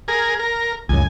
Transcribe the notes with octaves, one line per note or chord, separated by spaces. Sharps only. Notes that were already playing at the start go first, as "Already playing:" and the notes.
G#4 A#4
A#4
C#2 F#2 G#5